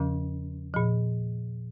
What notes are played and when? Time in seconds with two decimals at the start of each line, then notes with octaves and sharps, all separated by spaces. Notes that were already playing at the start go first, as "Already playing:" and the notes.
Already playing: E2 C#3 F3 C#4
0.74 A#2 F3